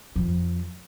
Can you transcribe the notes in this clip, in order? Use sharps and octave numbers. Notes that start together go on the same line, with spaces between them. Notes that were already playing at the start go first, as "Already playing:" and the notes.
F2 F3